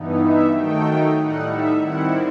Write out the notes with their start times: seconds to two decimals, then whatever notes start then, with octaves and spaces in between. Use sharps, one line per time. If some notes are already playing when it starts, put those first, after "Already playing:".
Already playing: G2 E3 B3 D#4
0.22 E5
0.53 D#3 F#3 A3 D#4 G5
1.17 A2 G3 D#4 F#5
1.50 E5
1.81 D#3 G3 C4 E4 F#5